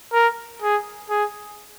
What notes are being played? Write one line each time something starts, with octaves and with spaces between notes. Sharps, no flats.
A#4
G#4
G#4